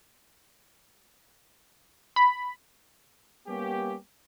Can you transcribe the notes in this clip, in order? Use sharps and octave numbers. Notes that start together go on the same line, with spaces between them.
B5
G3 A#3 B3 C#4 G4